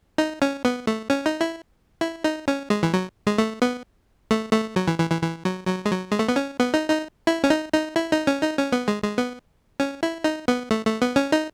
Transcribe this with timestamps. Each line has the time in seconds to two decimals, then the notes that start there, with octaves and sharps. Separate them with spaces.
0.18 D#4
0.42 C#4
0.65 B3
0.87 A3
1.10 C#4
1.26 D#4
1.41 E4
2.01 E4
2.24 D#4
2.48 C#4
2.70 G#3
2.83 E3
2.94 F#3
3.27 G#3
3.38 A3
3.62 B3
4.31 A3
4.53 A3
4.76 F#3
4.88 E3
4.99 E3
5.10 E3
5.22 E3
5.45 F#3
5.67 F#3
5.85 G#3
5.91 F#3
6.12 G#3
6.19 A3
6.29 B3
6.36 C#4
6.60 B3
6.74 D#4
6.90 D#4
7.27 E4
7.44 C#4
7.50 D#4
7.73 D#4
7.96 E4
8.12 D#4
8.27 C#4
8.42 D#4
8.58 C#4
8.72 B3
8.88 G#3
9.03 G#3
9.18 B3
9.80 C#4
10.03 E4
10.24 D#4
10.48 B3
10.71 A3
10.85 A3
11.02 B3
11.16 C#4
11.32 D#4